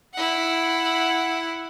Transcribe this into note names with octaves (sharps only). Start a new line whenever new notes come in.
E4 F#5